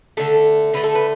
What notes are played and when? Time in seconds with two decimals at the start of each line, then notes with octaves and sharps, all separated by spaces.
0.17 D3 A3 A4
0.73 D3 A3 B4
0.84 A4
0.95 B4